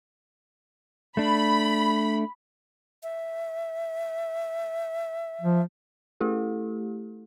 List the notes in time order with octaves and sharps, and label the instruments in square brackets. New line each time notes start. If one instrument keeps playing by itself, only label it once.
[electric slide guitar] A3 D4 [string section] B5
[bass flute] E5
[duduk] F3
[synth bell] A3 E4 G4 A4